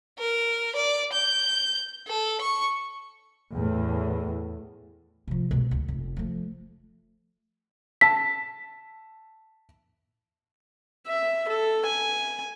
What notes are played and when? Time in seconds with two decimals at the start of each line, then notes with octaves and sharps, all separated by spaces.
0.19 A#4
0.76 D5
1.13 G6
2.08 A4
2.41 C#6
3.53 E2 A2
5.28 C3 F3
5.51 B2 G#3
5.71 D2
5.88 F1
6.17 F3 A3
8.01 A5 E6 B6
11.07 E5
11.48 A4
11.86 G#5